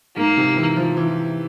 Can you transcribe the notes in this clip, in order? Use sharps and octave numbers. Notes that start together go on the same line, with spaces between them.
G#2 A#3
C3
E3
F3
E3